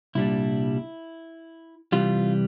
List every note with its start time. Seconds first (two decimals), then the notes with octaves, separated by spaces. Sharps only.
0.15 C2 A#2 G3 D4 E4
1.92 C3 E3 G3 F4